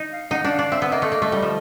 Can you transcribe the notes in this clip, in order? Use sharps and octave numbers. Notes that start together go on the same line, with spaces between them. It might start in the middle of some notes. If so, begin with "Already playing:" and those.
Already playing: D#4
F5
D#4 F#5
D4
F5
D4
C4 E5
B3
A#3 D#5
A3
A#3
A3
G3
F3